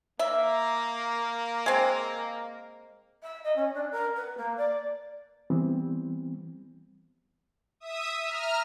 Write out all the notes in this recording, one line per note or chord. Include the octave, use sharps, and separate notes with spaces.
A#3 E5
G#3 C4
E5
D#5
C#4
D4
A#4
B4
A#3
D5
E3 G3 B3 C4
E5 D#6
A#5 F6